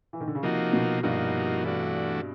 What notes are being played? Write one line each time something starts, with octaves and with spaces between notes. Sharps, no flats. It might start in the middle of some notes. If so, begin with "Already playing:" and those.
E3
D#3
D3
C#3
C3 F3 A#3 D#4 F#4
B2
G2 F3 A#3 D#4 F#4
E3 A3 D4 F#4